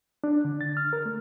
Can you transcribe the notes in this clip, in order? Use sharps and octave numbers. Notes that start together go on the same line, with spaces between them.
D4
D3
A6
F6
A#4
A3